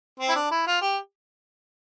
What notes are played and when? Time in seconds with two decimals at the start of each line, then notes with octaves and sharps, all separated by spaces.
0.20 C4
0.29 E4
0.36 D4
0.51 E4
0.67 F4
0.82 G4